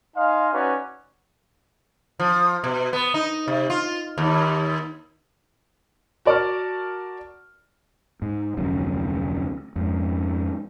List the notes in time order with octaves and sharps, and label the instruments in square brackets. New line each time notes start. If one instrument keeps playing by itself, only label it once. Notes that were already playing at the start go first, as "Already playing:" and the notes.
[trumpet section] D#4 D#5 F5 G#5 C6
C#4 D#4 F#4 B4 D5
[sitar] F3
B2
B3
D#4
C3
F4
D#2
[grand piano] F#4 A#4 D5 A5 C#6 F6
[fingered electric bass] G#2
F1 D2 F#3 C#4
F2 G#2